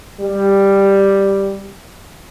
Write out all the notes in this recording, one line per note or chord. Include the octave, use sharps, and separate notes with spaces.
G3